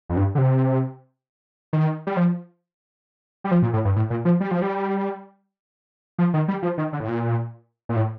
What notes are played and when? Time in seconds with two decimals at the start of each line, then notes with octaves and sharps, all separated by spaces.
0.09 F2
0.17 G2
0.35 D3
0.38 C3
1.73 D#3
2.07 G3
2.17 F3
3.44 G3
3.51 F3
3.62 A#2
3.73 A2
3.85 G2
3.96 A2
4.10 A#2
4.25 F3
4.40 G3
4.51 F3
4.62 G3
6.18 F3
6.34 D#3
6.48 G3
6.62 F3
6.78 D#3
6.93 D3
7.00 A2
7.08 A#2
7.89 A#2
7.96 A2